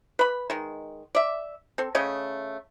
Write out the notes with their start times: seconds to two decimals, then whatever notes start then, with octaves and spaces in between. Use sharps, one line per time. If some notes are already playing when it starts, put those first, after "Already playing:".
0.19 B4 B5
0.50 D#3 G#3
1.15 D5 E5
1.78 C4 A4
1.95 C#3 A3 D#5 G5